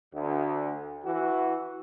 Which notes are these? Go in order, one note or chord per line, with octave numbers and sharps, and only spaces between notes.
D2
E3 F#4